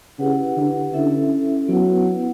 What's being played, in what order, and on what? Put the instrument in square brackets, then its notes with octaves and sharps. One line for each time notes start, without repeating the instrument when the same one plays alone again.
[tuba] C#3 [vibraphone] E4 G4 B4 F#5
[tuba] D3
[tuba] D3 [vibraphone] C#4 E4 A4 E5
[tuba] F#3 [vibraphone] B3 E4 B4 F#5